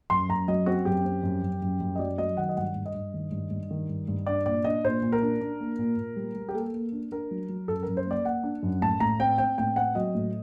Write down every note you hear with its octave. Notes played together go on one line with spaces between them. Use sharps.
F#2 C6
F#2 A#5
F#3 D#5
C4 F#4
F#2 G4
C4
F#2
F#2
F#2
F#2
D#5
F#3 D5
F#3 D#5
D#3 F#5
D#5
G2 F#5
G2
D#5
G2
D#3
G2
G2
D#3
G2
G2
D4 D5
A#2 D5
D4 D#5
A#2 C5
A#2
A#4
D4
D4
A#3
A#2
A#2
G3
G3
G4
A#3 A4
A#3
D4
D4 A#4
F#3
F#3
F#2 A4
A#4
F#2
C5
A#3 D5
A#3 F#5
D4
F#2
A2 A5
A2 A#5
C4 G5
C4 G5
A2 G5
C4 F#5
F#3 D#5
A2